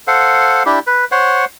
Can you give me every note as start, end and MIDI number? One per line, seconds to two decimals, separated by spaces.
0.07 0.63 69
0.07 0.63 72
0.07 0.63 77
0.07 0.63 78
0.66 0.79 62
0.66 0.79 64
0.66 0.79 67
0.87 1.05 71
1.12 1.45 72
1.12 1.45 73
1.12 1.45 78